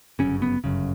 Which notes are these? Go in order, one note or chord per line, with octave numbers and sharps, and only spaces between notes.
G1 F#2 C#3 C#4
B3
G1 F#2 C#3